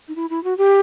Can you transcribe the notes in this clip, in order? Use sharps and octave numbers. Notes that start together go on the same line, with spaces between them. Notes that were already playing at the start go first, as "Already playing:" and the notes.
D#4
E4
E4
F#4
G4